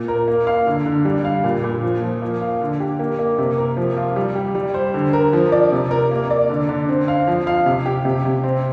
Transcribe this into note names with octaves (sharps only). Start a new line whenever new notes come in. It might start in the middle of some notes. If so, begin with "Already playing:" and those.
Already playing: A#2
A#4
A#3
F5
D3
D3
G3
F5
A#2
A#2
F3
F3
A#3
F5
D3
G4
A#3
A#3
C3
A#4
F3
F4
G3
G4
G3
C5
D3
A#4
F3
D5
C3
A#4
A#3
D5
D3
D3
C4
F5
F3
F5
C3
G4
C3
C3
C4